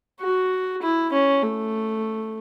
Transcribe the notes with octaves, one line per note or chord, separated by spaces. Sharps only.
F#4
E4
C#4
A3